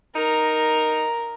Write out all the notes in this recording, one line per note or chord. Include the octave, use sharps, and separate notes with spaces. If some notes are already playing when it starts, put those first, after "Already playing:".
D#4 A#4 A#5